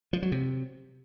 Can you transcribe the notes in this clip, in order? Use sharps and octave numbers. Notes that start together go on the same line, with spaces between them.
F3
F#3
C3